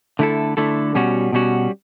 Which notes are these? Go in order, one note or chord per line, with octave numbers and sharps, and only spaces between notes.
D3 A3 E4 A4
D3 A3 E4 A4
B2 G3 C#4 F#4
B2 G3 C#4 F#4